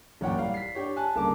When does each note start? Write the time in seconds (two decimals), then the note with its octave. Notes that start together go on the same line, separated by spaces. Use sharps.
0.21 A1 F#2 A#2 C#5 F#5 G5
0.38 G3 F5
0.54 B6 C7
0.75 D4 G4 C#5
0.96 G#5 A5 F#6
1.15 G1 C#3 A#3 A5 D6